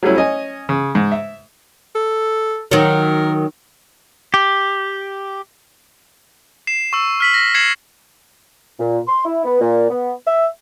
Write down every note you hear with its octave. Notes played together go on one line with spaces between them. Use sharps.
F#3 G3 A3 C#4 E4
C#4 D#5 G#5
C#3
G#2
E5
A4
D#3 F#3 A#4
G4
C7 E7
C#6 E6
F6 B6 F#7
A#6
G#6 C7 C#7 E7 F#7
A#2
C6
E4
B3
A#2
B3
E5